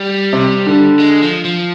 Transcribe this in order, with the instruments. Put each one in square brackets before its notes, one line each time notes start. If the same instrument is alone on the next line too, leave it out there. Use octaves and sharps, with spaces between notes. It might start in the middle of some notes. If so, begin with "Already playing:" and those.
Already playing: [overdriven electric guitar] G3
[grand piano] C3
D3
[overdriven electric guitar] G#3
F3
F3